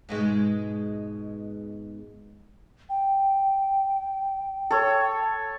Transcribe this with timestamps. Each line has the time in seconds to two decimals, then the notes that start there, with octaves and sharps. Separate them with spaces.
0.09 G#2 B2 G#3
2.89 G5
4.71 A4 C#5